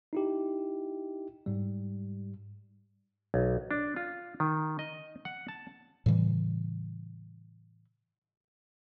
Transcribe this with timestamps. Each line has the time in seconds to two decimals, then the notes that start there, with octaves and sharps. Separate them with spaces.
0.13 D#4 E4 G4
1.46 G#2 G3
3.34 B1
3.71 D4
3.96 F4
4.40 D#3
4.79 D#5
5.25 F#5
5.48 A5
6.06 A2 C#3 E3 G3